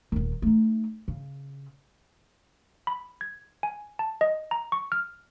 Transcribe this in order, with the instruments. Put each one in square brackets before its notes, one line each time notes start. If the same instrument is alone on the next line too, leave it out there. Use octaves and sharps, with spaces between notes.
[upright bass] D#1 D#3
A3 D#4
C#3
[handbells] B5
G#6
G#5
A5
D#5
A#5
C#6
F6